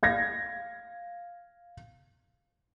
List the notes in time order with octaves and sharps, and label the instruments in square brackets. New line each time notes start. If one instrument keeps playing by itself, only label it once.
[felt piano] F5 G#6 A#6